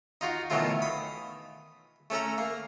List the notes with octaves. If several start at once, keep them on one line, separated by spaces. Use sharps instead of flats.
D#4 F4 F#4
B2 D#3 E3 F#3 A3 F4
B5 D#6
A3 C#4 A4 A#5
A#3